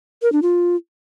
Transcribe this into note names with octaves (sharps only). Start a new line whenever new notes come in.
A#4
D4
F4